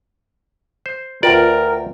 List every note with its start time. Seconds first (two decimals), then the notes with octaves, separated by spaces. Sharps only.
0.86 C5
1.23 D2 F4 A#4 B4 D5 G5